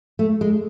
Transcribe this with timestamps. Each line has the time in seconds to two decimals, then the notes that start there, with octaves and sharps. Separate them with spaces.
0.19 A3
0.41 G#3